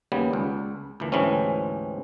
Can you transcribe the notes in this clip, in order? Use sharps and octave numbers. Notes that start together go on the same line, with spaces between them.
D#2 C#3 G3 B3
C#2
D2 A#2 E3
D2 G#2 E3 G3 C4 C#4